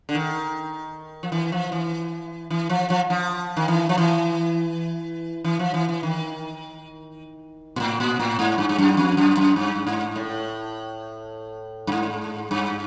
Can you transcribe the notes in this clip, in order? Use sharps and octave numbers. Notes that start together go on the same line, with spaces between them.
D3
D#3
F3
E3
F3
E3
E3
F3
F3
F3
D#3
E3
F3
E3
E3
F3
E3
E3
D#3
A#2
A2
A#2
A2
G#2
G2
G2
F#2
F2
F#2
F#2
G2
G#2
A2
G2
G#2
G2